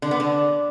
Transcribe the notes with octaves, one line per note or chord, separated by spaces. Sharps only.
D3
B3
D3